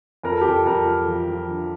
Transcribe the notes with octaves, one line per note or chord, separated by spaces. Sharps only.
F2 A#4
A4
G4
F2 A4
F2 A#4
F2
F3
F3
D3